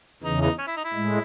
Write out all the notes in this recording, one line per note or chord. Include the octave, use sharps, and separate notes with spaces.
E2 C#3 E3 D#4
D#4
C#4
E4
D#4
E4
A2 G#3